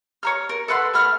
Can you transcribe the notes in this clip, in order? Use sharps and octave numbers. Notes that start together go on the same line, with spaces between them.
C#5 A#5 F6
A#4
A4 B4 F#5 C6
A3 B5 F6